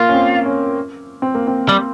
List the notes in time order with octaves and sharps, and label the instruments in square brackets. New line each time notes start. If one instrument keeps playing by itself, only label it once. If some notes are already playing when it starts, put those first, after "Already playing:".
Already playing: [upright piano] A#3 [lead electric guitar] F4
[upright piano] C#4
C4
C#4
C4
A#3
C4
[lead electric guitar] G3